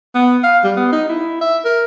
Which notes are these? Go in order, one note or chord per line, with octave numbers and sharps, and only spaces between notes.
B3
F5
G3
B3
D#4
E4
E5
A#4